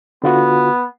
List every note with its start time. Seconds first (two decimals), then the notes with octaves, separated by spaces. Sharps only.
0.24 D3 B3 F4 F#4